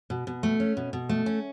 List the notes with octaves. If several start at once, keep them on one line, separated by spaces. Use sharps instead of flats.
B2
B2
A3
C#4
B2
B2
A3
C#4